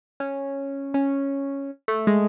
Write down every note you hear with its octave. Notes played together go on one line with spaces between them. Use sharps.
C#4
C#4
A3
G#3